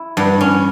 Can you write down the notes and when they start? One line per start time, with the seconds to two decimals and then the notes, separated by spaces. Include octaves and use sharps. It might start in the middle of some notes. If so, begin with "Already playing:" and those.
Already playing: E4
0.17 G2
0.41 C#4